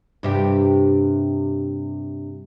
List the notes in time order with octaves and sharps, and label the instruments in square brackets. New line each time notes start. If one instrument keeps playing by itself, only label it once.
[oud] G2 C3 G4